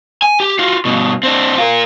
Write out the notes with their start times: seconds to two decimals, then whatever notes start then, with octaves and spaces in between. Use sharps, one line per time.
0.22 G#5
0.40 G4
0.59 F4 F#4
0.85 G2 B2
1.23 C4 D4
1.58 F4 A#4